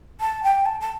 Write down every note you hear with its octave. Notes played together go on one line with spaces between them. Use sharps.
A5
G5
A5
A5